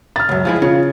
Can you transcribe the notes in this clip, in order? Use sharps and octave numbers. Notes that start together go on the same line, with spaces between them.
F6 A6
C#2 F#2
F3 G#3 E4
C#3 F4